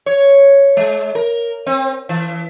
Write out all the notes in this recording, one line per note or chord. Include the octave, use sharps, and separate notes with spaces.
C#5
G#3
A#4
C4
E3